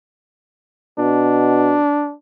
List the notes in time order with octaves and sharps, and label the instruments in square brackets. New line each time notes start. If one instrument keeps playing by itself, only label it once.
[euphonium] B2 [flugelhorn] D4